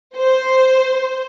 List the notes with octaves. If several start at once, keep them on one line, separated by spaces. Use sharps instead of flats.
C5